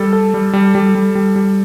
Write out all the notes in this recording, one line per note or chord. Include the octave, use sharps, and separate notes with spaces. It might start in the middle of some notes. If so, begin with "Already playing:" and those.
Already playing: G3 A4
A4
G3
G3
G3
G3
G3
G3